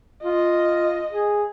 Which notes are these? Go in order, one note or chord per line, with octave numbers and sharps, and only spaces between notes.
F4 D#5
G#4